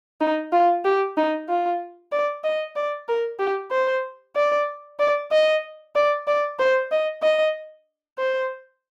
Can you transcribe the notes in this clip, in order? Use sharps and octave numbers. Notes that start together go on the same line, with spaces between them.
D#4
F4
G4
D#4
F4
D5
D#5
D5
A#4
G4
C5
D5
D5
D#5
D5
D5
C5
D#5
D#5
C5